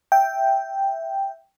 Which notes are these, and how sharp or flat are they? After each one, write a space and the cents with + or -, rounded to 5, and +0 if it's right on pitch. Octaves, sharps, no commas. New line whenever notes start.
E5 +0 G5 +0